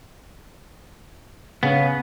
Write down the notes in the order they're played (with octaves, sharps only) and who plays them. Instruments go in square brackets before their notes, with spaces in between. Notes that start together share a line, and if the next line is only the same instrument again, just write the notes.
[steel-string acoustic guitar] C#3 [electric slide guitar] B3